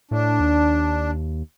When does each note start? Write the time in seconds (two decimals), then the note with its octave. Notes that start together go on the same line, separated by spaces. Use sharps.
0.11 A2 D4
0.40 D#2